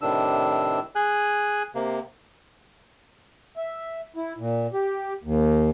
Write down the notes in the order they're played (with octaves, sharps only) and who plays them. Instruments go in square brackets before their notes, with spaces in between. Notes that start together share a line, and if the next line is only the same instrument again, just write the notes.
[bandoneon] A2 C3 D#3 D4 E6
G#4 G#5 F#6
C3 A#3
[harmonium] E5
E4
A#2
G4
D#2